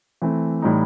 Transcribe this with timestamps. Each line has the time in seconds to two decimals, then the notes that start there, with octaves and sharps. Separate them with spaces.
0.22 E3 A3 C4
0.62 A2 E3 G3 D#4